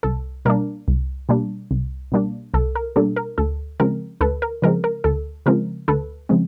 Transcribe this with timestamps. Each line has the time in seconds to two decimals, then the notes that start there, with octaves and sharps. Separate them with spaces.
0.03 C2 A4
0.45 B2 G3 A#3 D4 A#4
0.88 C2
1.29 B2 G3 A#3 D4
1.71 C2
2.12 B2 G3 A#3 D4
2.54 C2 A4
2.75 A#4
2.96 B2 G3 A#3 D4 A4
3.16 A#4
3.38 D2 A4
3.80 C#3 F3 G#3 C4 A#4
4.21 D2 A4 B4
4.42 A#4
4.62 C#3 F3 G#3 C4 A#4
4.84 A#4
5.04 D2 A4
5.46 C#3 F3 G#3 C4 A#4
5.88 D2 A4 B4
6.29 C#3 F3 G#3 C4